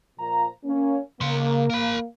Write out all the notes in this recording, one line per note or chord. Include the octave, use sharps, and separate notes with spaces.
A#2 F3 A#5
A#3 C#4
C#3 A#3 C6
A#4 B5